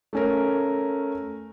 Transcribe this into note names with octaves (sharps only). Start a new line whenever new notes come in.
A3 C#4 A#4